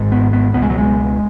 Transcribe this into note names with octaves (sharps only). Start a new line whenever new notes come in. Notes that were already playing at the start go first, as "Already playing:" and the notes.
Already playing: G#1 G#2
B3
B3
C#2 B2 B3
G#3
F#3
G#3